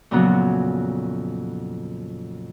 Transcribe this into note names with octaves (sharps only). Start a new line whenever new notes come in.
F2 A#2 C#3 F#3 B3 F#4